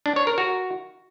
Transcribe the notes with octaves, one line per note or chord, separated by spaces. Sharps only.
D4
C#5
A#4
F#4